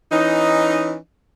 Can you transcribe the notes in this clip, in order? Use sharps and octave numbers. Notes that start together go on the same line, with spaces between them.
E3 C#4 D#4